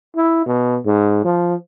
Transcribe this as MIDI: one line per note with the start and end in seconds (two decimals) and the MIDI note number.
0.16 0.44 64
0.46 0.79 47
0.86 1.22 44
1.24 1.55 53